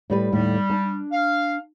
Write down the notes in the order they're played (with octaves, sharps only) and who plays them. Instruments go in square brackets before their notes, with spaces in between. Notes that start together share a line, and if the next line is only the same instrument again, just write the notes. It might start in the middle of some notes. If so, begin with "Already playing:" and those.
[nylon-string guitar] A2 G3 B4
[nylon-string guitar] D#2 A2 [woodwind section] G3
[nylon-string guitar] D4 A5
[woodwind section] F5